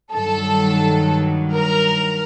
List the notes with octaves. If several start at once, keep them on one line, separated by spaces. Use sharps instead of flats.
G2 D#3 F#3 A4
A#4